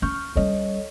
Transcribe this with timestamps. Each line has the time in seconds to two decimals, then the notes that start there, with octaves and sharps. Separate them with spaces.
0.02 C#4 C#6 F6 G6
0.35 G3 C#4 A4 C#5 D#5